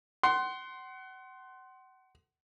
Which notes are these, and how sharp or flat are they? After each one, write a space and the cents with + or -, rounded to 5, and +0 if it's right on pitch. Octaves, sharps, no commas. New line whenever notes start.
F#5 +30 C6 +0